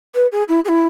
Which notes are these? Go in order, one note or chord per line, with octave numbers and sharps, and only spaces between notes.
B4
G#4
E4
G#4
E4